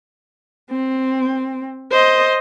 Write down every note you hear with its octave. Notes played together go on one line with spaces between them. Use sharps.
C4
C5 D#5